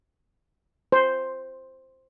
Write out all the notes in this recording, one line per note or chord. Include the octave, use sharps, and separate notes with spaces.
C5